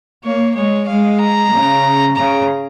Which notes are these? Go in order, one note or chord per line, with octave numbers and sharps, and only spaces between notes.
A#3 C#5
G#3 C#5
G#3 F5
A#5
C#3
C#3 A#5